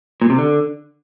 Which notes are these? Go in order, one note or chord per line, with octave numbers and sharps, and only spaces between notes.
A#2
C3
D3